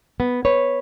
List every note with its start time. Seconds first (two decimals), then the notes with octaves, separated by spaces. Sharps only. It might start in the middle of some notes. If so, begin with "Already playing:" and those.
0.20 B3
0.45 B4 C#5